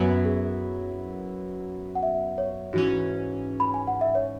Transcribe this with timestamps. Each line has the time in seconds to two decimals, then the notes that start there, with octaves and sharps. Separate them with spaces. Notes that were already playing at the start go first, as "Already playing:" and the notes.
Already playing: F#2 F#3 B3 E4 G#5
0.25 G#4
1.95 F#5
2.03 E5
2.38 C#5
2.73 G#2 E3 C#4 F#4
3.60 B5
3.74 G#5
3.87 F#5
4.01 E5
4.15 C#5